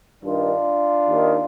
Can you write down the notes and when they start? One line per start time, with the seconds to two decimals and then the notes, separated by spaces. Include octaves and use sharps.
0.23 G2 D#3 D4 F4
1.08 D#2 D#3